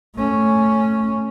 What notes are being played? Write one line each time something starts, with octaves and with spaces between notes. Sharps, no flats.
A3 C#4